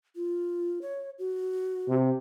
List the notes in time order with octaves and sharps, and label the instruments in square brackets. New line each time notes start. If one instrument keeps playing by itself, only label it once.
[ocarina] F4
C#5
F#4
[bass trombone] C3